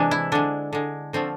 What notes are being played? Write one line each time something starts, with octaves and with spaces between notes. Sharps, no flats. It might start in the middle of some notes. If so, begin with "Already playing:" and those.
Already playing: C3 E3 G#3 D4
E4
D3 G#3 D4
D3 G#3
D3 F3 A3 C4